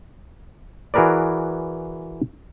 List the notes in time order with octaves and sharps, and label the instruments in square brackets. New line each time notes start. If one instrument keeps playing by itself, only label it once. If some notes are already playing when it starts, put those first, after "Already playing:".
[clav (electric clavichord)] E3 F#4 G#4 A#4 B4 D5